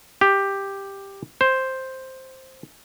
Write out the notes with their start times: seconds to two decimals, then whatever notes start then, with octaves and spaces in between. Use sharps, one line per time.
0.21 G4
1.41 C5